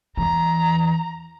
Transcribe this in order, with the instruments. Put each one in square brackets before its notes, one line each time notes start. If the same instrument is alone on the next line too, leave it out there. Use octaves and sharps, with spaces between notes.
[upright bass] E2 E3 [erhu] A#5